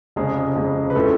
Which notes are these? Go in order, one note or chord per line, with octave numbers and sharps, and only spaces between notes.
F1 F2 C#3 G#3 G#4
F1 F2 C#3 G#3
B4
A2 G#3 A3 C#4 F4 A4